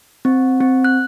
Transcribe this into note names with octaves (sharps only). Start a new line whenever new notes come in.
C4
C4
F#6